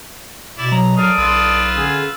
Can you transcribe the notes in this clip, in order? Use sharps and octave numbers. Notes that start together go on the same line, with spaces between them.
B2 E4 D5
F#3 A#5
A4 A#4 D5 F5 D#6
B1 F4 B4 E6
D3 C#4 G#4